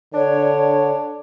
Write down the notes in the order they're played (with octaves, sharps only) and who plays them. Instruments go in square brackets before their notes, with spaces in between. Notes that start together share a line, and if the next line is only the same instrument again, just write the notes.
[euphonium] D3 [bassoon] D4 [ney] C#5